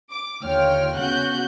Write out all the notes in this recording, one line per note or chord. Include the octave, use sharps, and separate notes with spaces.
D6
D#2 D3 F4 C#5 G5 F6
C#3 B3 C#4 F#4 F#6 G6